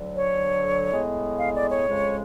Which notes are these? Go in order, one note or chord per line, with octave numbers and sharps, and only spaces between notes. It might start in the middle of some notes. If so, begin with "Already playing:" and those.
Already playing: D2 D3 F#3
C#5
A2 G#3 B3
F5
D5
C#5
F2 C#3 G#3